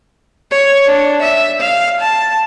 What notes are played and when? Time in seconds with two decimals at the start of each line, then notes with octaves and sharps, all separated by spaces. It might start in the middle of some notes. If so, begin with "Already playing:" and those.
0.51 C#5
0.86 D4
1.22 E5
1.60 F5
2.01 A5